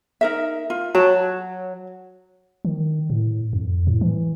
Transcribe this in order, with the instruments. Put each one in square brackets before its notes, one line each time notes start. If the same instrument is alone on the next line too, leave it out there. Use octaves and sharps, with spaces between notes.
[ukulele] D#4 A#4 E5
F4
[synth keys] F#3 [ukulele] A5
[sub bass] D#3
A2
F2
A2
E3